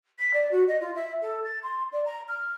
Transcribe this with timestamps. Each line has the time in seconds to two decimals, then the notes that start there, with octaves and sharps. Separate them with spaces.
0.19 B6
0.33 D5
0.51 F#4
0.68 D#5
0.80 F4
0.95 E5
1.22 A4
1.44 A6
1.63 C6
1.92 D5
2.05 A#5
2.28 F6